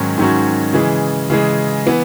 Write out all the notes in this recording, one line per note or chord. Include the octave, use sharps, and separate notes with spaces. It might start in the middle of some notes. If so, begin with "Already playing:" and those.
Already playing: G#2 D#3 F#3 C#4 F#4
G#2 D#3 F#3 C#4 F#4
C#3 E3 G#3
C#3 E3 G#3
E3 B3